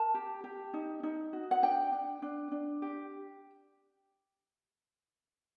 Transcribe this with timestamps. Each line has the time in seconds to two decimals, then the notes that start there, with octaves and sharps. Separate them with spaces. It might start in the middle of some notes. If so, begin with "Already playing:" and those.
Already playing: A#4 A5
0.14 G4
0.44 G4
0.74 D#4
1.03 D#4
1.33 F#4
1.51 F#5
1.63 D4 G5
1.92 D4
2.22 D4
2.52 D4
2.82 G4